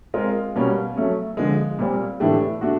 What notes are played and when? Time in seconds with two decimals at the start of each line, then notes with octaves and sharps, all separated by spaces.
0.14 G#3 C4 F4 A#4
0.56 B2 G3 A#3 C#4
0.96 F#3 A3 C#4
1.37 D3 F3 G#3
1.79 A#2 G3 C4
2.20 A2 E3 A3 D4 G4
2.61 A3 D4 F#4